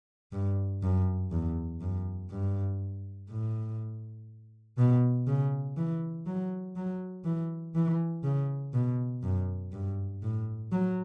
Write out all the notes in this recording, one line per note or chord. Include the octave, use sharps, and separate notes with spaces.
G2
F#2
E2
F#2
G2
A2
B2
C#3
E3
F#3
F#3
E3
E3
C#3
B2
F#2
G2
A2
F#3